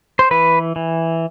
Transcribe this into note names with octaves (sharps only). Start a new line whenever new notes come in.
C5
E3 B4
E3